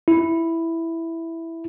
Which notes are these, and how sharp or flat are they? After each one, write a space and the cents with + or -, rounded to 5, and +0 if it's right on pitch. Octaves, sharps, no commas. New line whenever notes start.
E4 +0